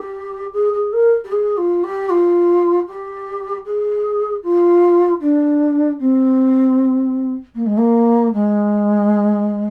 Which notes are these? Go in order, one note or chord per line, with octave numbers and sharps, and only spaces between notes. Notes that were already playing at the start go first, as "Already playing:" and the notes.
Already playing: G4
G#4
G#4
A#4
G4
G#4
F4
G4
F4
G4
G#4
F4
D4
C4
A#3
G#3
A#3
G#3